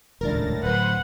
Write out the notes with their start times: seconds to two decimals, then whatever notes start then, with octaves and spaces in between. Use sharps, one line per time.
0.21 D#1 C#2 A2 D4 A#4 A6 A#6
0.63 D1 B4 C5 F#5